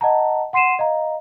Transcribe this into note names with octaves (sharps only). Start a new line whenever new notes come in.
D#5 F#5 A5 A#5
F#5 C6 C7 D#7 E7
D#5 F5 A#5